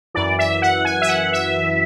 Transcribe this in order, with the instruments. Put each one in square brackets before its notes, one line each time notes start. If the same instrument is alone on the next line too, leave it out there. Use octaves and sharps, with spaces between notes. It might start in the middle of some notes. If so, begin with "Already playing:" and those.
[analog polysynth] F#2 E3 D5
E5
F#5
G#5
E5
F#5
E5